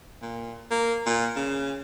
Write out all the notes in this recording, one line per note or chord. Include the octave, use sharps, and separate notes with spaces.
A#2
A#3
A#2
C#3